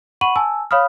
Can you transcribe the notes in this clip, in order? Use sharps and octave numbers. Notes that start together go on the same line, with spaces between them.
F#5 B5 C#6 D#7 F#7
G#5 A5 E6
C#5 F5 B5 D#6 F6